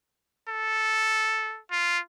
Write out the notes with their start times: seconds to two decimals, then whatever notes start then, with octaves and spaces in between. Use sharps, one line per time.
0.49 A4
1.71 F4